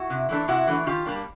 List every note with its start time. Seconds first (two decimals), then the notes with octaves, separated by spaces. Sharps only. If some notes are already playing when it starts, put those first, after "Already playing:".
Already playing: E4 F#4
0.10 C3
0.29 E3 A3 D4
0.48 C3 E4 F#4
0.67 E3 A3 D4
0.86 D#3 F4 G4
1.06 G3 A#3 D4